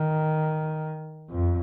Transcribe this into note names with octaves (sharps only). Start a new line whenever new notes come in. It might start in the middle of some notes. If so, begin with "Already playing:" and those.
Already playing: D#3
F2